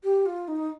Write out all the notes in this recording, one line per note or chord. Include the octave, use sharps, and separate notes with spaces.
G4
F4
D#4